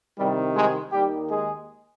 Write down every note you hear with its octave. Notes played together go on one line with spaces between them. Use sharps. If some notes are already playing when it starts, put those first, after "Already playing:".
C2 C3 D#3 G3
G#2 G#3
D#2 D#3 G3 G4
G#3 G#4